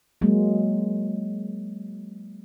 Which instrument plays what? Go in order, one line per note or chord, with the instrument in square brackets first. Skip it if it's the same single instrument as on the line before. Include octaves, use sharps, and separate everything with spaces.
[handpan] F#3 G#3 A#3